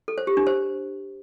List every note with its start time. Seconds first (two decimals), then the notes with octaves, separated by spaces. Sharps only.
0.08 A4
0.18 C5
0.27 G4
0.37 D4
0.47 C5